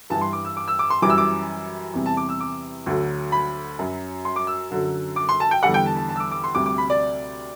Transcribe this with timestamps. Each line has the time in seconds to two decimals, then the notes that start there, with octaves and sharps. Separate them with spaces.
0.10 G2 E3 G3 A5
0.21 C6
0.33 D6
0.45 E6
0.57 D6
0.68 E6
0.79 D6
0.90 C6
1.02 F#2 E3 G3 D6
1.10 E6
1.18 D6
1.94 E2 C3 G3
2.06 A5
2.17 D6
2.29 E6
2.40 D6
2.86 D2 D3 F#3
3.32 B5
3.79 F#2 F#3
4.25 C6
4.36 D6
4.47 E6
4.70 F#2 D3 F#3
5.16 D6
5.29 C6
5.40 A5
5.51 G5
5.63 E2 D3 G3 F#5
5.74 G5
5.86 A5
5.97 A5
6.09 A5
6.16 E6
6.20 D6
6.31 D6
6.44 C6
6.55 D2 C3 G3 D6
6.66 D6
6.78 B5
6.90 D5